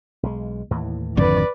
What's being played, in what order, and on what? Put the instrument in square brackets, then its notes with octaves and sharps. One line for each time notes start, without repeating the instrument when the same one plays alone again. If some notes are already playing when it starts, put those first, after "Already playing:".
[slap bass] B1 G#3
D#2 A2 E3
[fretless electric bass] G#1 F2 D3 [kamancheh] B4 D5